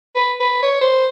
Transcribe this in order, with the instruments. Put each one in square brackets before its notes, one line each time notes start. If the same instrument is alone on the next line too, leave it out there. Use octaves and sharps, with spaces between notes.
[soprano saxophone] B4
B4
C#5
C5